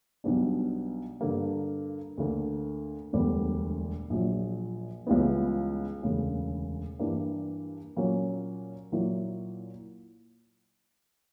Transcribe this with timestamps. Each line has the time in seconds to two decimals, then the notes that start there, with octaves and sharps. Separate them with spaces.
0.24 B1 B2 G3 B3 D4
1.21 G2 D3 A#3
2.17 D2 D3 A#3
3.13 E1 D2 D3 G3 B3
4.10 A#1 A#2 F#3
5.07 C#2 C#3 E3 G3 B3
6.03 E1 D2 C#3
6.99 G2 E3 G3 A#3 D4
7.96 A#2 F#3 A#3 C#4
8.92 A#2 F#3 A#3 E4